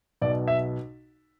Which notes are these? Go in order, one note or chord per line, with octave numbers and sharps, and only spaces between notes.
B1 B2 D5
E5